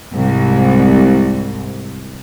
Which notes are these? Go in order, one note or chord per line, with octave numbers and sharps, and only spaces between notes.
C2 G#2